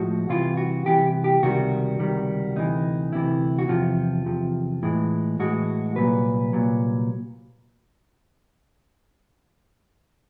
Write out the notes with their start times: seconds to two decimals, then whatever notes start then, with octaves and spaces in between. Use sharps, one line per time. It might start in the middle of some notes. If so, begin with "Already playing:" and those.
Already playing: A2 F3 G#3 F#4
0.29 C2 C3 E3 F4
0.57 F#4
0.86 C2 C3 E3 G4
1.24 G4
1.42 C#2 C3 D#3 G3 F#4
1.99 C#2 C3 D#3 G3
2.56 D2 C3 E3 D#4
3.12 D2 C3 E3 E4
3.59 F#4
3.69 E2 C3 F3 F4
4.26 E2 C3 F3
4.83 A2 E3 G#3
5.40 A2 E3 G#3 F#4
5.96 C2 A#2 F#3 B4
6.53 C2 A#2 F#3